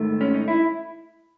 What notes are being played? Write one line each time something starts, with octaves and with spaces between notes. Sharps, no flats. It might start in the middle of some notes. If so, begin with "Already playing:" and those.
Already playing: G#2 D#3 A3
C#4
D#4
E4